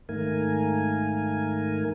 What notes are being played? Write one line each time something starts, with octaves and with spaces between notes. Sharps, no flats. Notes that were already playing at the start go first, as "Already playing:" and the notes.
G#2 D#3 A3 A#3 A#4 G#5